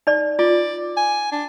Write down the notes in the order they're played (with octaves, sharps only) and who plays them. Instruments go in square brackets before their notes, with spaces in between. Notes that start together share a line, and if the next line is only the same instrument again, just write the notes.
[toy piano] D#4 D5
[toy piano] F4 [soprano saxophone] D5
[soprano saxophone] G#5
D4